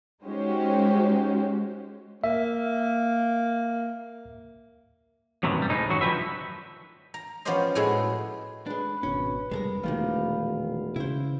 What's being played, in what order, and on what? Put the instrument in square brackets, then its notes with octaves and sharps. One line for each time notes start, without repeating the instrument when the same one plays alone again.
[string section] G#3 C#4 D#4 F#4 G4 C5
[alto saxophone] A#3 [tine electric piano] E5
[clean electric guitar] F#2 A2 C3 D#3 E3
G2 G3
D2 A2 G#3 D#4
F#2 D#3 F#3 F#4
C#2 D3 F3 G4 B4 E5
[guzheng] A#5
F3 B3 C#4 G4 C5 D#5
A2 G#3 B3 E4 F#4 G#4
[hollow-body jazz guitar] G#3 D4 [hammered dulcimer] B4
[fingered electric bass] G#1 B2 D4 [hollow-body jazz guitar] C#4
[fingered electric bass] F1 G#2 G3 [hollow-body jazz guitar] G#3 A4 A#4
[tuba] E1 [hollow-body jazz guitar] A#2 D#3 F3 [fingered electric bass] A3 [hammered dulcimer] F5
[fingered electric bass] C#3 [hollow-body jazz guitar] E4 C5